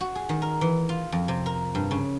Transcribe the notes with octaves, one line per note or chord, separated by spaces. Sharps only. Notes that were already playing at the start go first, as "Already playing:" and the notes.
F#4
G#4
D#3
A#4
E3
F4
F2
C3
A#4
G2
C#3